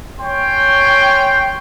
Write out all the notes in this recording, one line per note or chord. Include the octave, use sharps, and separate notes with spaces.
C#4 C#5 G5 C6